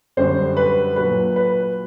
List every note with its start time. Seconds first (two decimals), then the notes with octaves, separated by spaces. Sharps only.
0.17 F#2 D3 G3 C5
0.57 B4
0.96 A#2 F#3 B4
1.36 B4